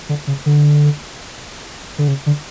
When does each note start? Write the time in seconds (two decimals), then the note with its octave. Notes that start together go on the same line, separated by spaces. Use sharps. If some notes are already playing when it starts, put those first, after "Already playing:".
0.09 D3
0.27 C#3
0.46 D3
1.98 D3
2.08 C#3
2.26 D3